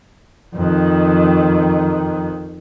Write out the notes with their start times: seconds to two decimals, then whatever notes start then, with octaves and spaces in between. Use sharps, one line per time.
0.55 F2 D#3